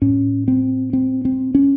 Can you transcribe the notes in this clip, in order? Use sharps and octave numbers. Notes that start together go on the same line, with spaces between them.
A2 C#4
C4
C4
C4
C#4